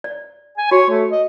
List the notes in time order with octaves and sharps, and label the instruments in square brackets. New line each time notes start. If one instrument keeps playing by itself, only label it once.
[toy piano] D5
[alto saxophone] G#5
[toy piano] F#4 [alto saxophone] C#5
[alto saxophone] A3
D#5